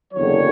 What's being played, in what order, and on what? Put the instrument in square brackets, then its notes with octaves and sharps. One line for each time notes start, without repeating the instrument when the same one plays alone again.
[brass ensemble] F#1 E2 D3 F#3 C#5